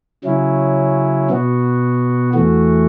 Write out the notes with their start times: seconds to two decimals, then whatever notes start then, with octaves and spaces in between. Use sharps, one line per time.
0.24 C#3 F#3 C#4 E4
1.30 B2 B3 F#4
2.34 E2 E3 A3 F#4